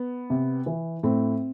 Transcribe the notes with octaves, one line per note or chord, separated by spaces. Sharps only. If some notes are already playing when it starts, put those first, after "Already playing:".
Already playing: B3
C3
E3
A2 C4